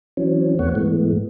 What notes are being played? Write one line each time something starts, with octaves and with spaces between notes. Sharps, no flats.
E3 F#3 C4 C#4
E2 A3 B3 C4 C#5 F#5
G#2 E3 G#3 A3 B3